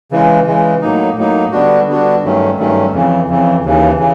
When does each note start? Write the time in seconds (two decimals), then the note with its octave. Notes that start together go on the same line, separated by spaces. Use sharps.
0.11 C#3 E3 G#3
0.47 C#3 E3 G#3
0.82 A2 F#3 A#3 D#4
1.17 A2 F#3 A#3 D#4
1.52 D3 G3 B3 D4 F#4
1.87 D3 G3 B3 D4 F#4
2.23 G2 D#3 F#3 A3 C#4
2.58 G2 D#3 F#3 A3 C#4
2.93 F2 C#3 E3
3.28 F2 C#3 E3
3.64 D#2 C#3 E3
3.98 C#3 E3